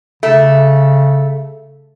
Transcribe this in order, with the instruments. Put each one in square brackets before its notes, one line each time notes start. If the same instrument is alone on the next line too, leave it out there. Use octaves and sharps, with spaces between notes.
[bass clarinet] C#3 [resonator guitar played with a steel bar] A3